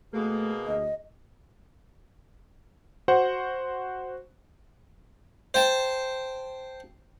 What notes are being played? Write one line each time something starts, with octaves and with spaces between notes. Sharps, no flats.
B2 A3 A#3 G#4
D2 D#5
F#4 C5 F#5
C5 G5 A5